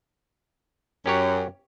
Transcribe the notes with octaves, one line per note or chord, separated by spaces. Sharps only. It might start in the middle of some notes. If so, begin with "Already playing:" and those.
F#2 C#4 G4 C#5